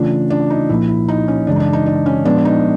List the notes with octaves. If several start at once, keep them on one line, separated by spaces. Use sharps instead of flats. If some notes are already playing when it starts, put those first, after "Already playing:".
Already playing: C#3 E3 A3 C#4 D4 F4
D4
D#4
C2 A#2 F3 A#3 E4
E4
D#4
C#4
F#2 C#3 E3 G#3 D4
D#4
D4
D#4
D4
C#4
A#2 F3 G#3 B3 D4
D#4